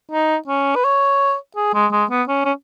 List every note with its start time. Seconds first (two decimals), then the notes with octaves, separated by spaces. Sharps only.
0.12 D#4
0.48 C#4
0.76 B4
0.84 C#5
1.56 G#4
1.74 G#3
1.92 G#3
2.10 B3
2.28 C#4
2.45 C#4